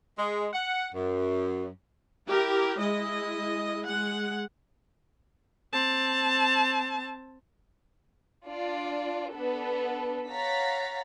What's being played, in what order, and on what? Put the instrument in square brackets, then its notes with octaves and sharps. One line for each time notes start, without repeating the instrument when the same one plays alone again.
[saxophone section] G#3
F#5
F#2
[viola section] E4 G4 A#4
G#3 E4 D#5
G#3 F#5
[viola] C4 A5
[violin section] D4 F4 D5
B3 D4 A4 B4
C#5 F5 F#5 A#5 A6 B6